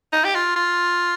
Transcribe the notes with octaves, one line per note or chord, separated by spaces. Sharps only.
D#4
G4
F4
F4